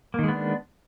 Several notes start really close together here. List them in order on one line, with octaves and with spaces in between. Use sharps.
A#3 D#3 G#3 B3 D4